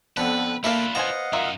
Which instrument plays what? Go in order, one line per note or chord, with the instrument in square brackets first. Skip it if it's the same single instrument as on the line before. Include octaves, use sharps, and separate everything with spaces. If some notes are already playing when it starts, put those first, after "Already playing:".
[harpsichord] F2 D3 B3 [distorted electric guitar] B4
[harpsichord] A#3 A4 [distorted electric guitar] D4 F4 [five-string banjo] E5 F5 [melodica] B5
[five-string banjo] B3 C5 G#5 [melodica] D#5 F5 F#5 [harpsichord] A#5
[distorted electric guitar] F#2 D#4 [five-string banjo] F4 A#4 E5